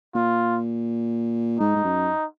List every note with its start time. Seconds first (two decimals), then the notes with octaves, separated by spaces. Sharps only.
0.15 A#2 F4
1.59 G#2 D#4
1.76 G#2
1.84 F#2